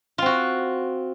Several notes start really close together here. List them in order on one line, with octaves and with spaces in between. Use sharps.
F4 C4 F#4